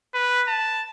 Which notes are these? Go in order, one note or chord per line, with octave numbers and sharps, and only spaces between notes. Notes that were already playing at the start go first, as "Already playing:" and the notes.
B4
A5